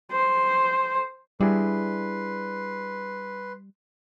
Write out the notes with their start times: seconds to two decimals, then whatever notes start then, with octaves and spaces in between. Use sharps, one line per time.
0.12 C5
1.41 G3 D4 E4 G#4 B4 C6